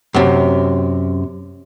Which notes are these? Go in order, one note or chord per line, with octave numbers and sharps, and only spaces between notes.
F#2 C3